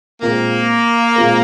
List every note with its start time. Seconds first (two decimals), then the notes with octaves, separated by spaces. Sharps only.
0.22 A#2 G#3 A#3 C4 F4 A#4
1.16 A#2 G#3 C4 F4 A#4